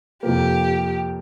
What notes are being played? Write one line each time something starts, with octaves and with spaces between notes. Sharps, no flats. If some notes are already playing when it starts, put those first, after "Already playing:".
F2 C3 F3 A#3 G4